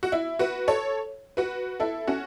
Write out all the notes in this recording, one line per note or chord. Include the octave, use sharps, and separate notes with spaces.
F#4
E4
F#4 B4
A4 C#5
F#4 B4
E4 A4
C#4 F#4